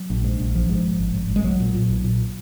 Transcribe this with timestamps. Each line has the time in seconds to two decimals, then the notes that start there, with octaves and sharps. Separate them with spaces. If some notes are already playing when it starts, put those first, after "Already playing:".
Already playing: F#3
0.10 A#1
0.24 G#2
0.40 A#1
0.55 G#1 F3
0.69 G#2
0.85 G#2
0.99 G#1
1.14 G#1
1.29 G#1
1.36 G#3
1.44 B1 F#3
1.60 A#2
1.75 A#2
1.89 B1
2.04 A#2